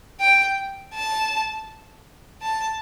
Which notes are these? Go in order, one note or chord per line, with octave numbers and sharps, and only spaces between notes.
G5
A5
A5